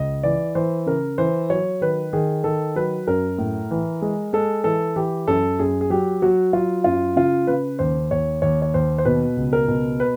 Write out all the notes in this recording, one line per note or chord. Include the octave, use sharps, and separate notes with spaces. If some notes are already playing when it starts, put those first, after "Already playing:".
Already playing: C#2 D#5
E3 D5
E3 C5
C#3 A#4
E3 C5
F#3 C#5
D#3 B4
D#3 G#4
D#3 A4
F#3 B4
F#2 A#4
A2
E3
G#3
G#3 A4
E3 A4
E3 G4
F#2 A4
F#2 G#4
G#4
F#3 G4
F#3 F#4
F#3 F4
F#2 F4
C#3 F4
C#3 B4
D#2 C5
D#2 C#5
D#2 C#5
C#5
D#2 C5
C5
B2 B4
C#2
A#4
B2
B4